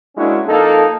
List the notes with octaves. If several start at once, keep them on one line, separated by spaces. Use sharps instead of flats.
G#3 A#3 C#4 D4 E4 F#4
F2 A#3 D#4 A4